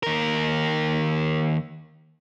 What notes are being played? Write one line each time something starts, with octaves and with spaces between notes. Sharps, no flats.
D#2 A#4